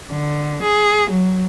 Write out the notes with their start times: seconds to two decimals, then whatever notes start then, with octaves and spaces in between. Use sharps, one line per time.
0.11 D3
0.62 G#4
1.10 F#3